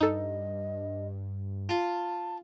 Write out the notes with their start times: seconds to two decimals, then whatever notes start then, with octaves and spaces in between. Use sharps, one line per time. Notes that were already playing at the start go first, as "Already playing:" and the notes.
0.01 G2 D#4 A4 D#5
1.69 F4 A5